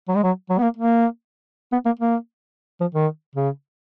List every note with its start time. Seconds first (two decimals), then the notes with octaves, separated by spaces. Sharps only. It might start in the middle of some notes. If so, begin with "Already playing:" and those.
0.08 F#3
0.16 G#3
0.23 F#3
0.50 F#3
0.58 B3
0.63 A#3
0.77 A#3
1.72 B3
1.85 A#3
1.99 A#3
2.81 F3
2.95 D#3
3.35 C#3